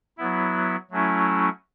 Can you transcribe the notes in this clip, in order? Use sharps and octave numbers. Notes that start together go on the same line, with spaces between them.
F#3 B3 E4
F#3 A3 C#4 E4